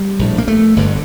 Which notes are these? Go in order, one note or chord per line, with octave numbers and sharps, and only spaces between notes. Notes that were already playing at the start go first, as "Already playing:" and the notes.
Already playing: G3
A#1 A2
A#3
A3
G1 G2 D3